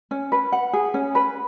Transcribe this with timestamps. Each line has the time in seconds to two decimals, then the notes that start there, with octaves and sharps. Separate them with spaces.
0.11 C#4
0.32 B4
0.52 F#5
0.73 G#4
0.94 C#4
1.15 B4